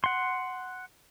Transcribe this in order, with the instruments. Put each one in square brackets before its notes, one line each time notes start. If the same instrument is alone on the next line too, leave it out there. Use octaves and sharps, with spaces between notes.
[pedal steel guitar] F#5 C6